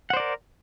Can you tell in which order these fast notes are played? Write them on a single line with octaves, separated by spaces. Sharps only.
F#5 C5 D5 A#4